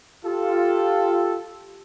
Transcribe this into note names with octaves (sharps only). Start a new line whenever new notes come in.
F4 G4 A4